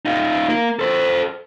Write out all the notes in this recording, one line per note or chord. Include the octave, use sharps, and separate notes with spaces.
D#4 F4
A#3
A4 C5